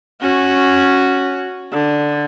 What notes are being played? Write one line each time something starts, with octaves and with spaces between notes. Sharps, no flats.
C#4 F#4
D3